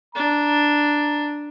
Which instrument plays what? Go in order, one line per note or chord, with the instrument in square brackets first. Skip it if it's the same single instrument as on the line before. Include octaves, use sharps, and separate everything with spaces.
[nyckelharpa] D4 [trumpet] A#5